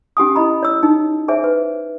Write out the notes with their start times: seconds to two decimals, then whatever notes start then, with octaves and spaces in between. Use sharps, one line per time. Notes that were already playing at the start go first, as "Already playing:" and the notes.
0.17 C#4 G4 G#5 D#6
0.36 E4 D#5 A#5 B5
0.63 C#5 E6
0.83 D#4
1.28 G#4 C5 C#5 E5 G#5
1.44 B4